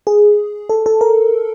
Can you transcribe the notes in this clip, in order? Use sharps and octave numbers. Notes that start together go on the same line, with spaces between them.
G#4
A4
A4
A#4